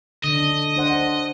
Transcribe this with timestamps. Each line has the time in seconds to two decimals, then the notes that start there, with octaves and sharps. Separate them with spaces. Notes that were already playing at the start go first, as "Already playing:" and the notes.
0.24 D3 D4 D#5
0.76 D4 C5 F#5